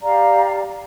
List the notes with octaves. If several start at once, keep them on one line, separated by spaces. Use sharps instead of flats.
G4 D5 F5 A#5